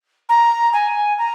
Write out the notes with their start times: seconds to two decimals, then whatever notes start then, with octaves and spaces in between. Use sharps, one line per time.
0.29 A#5
0.73 G#5
1.18 A#5